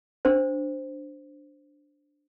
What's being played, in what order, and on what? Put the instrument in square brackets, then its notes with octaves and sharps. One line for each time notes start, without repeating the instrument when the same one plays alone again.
[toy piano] D4 C5